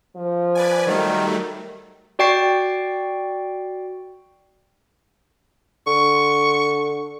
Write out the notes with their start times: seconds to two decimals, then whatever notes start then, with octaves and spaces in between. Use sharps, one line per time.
0.16 F3
0.55 B4 D5 G#5
0.87 D#3 F#3 G3 A3
2.19 F#4 D5 G5 C#6 C7 D7
5.87 D3 C#6